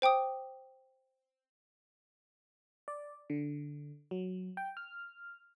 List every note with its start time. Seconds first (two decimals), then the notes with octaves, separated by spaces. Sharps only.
0.02 C5 G5 D6 D#6
2.88 D5
3.30 D3
4.11 F#3
4.57 G5
4.77 F6